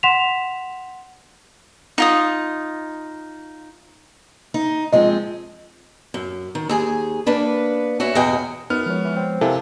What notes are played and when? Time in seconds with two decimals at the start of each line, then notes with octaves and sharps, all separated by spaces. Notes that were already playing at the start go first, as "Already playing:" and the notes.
0.03 F#5 C6 B6 E7 F7
1.98 D#4 F4 D#6
4.54 D#4
4.93 F3 G#3 C4 D#5
6.14 F#2
6.55 D#3
6.69 D#2 G#4 G#5
7.26 A#3 B3 D4 B4
8.00 F#4 C#5 E5 G#5
8.15 E2 B2 F#4 D#5 G5 G#5
8.70 F#2 B3 D#4 F6
8.86 F3 G#3 C#5
9.04 E3
9.16 C4
9.41 C3 E4 A4 A#4 F5 G#5